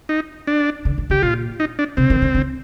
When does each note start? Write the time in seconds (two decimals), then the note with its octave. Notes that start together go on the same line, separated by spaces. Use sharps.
0.09 D#4
0.47 D4
0.85 D3
0.98 D#3
1.10 D3 G4
1.22 A#2 F4
1.60 D#4
1.79 D4
1.97 C3 C4
2.10 D#3
2.22 D3
2.35 D3